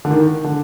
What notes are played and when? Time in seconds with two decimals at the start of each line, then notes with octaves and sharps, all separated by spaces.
0.05 D3
0.11 D#3
0.44 D3